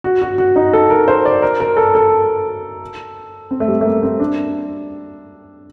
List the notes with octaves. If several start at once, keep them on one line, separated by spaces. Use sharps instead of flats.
F#4
F#4
F#4
D#4
A4
A#4
C5
D5
A#4
A#4
A4
A4
C4
A3
G3
A3
A#3
C4
D4